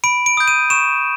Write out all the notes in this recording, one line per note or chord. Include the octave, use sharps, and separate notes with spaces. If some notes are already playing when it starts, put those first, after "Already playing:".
B5 D7
D7
D#6 G6
D#7
C#6 E7